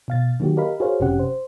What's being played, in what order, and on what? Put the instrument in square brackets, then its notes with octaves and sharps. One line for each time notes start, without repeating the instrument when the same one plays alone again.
[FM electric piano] B2 F5 A6
D#3 F#3 A#3 F#4 G4
G4 A#4 D#5 F5 B5
F#4 G#4 A#4 C5 C#5 F5
G1 F#2 C3 C#4 G4 F#5
C5